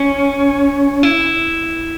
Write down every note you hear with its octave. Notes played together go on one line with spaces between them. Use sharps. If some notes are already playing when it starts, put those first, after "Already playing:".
Already playing: C#4
E4